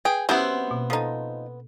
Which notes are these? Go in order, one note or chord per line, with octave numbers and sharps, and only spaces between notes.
G#4 B4 G5
F#3 B3 C#4 E4 G4 C5
C4
B2 A#3
F3 D#4 A4 D#6